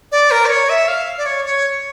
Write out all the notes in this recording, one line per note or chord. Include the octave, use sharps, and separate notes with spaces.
D5
A#4
D5
C#5
E5
F5
D5
C#5
C#5